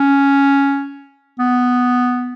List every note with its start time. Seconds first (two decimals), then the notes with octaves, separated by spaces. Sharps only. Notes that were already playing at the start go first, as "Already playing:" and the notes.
Already playing: C#4
1.39 B3